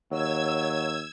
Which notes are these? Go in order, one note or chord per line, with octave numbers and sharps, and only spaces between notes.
D#2 F#3 E6 G#6